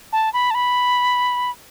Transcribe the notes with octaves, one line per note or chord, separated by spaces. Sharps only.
A5
B5
A5
B5